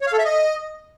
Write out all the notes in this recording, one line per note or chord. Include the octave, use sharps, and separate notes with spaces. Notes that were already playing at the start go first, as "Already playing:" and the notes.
C#5
F5
A4
E5
D#5